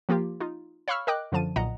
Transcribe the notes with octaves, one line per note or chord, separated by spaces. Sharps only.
F3 A#3 F4 G4
D#4 F4
C#5 F5 B5 C#6 E6 F6
A#4 D#5 G5 D6 F#6
F#2 D3 F3 A5 D#7
B1 A#2 D#5 F#5 A#5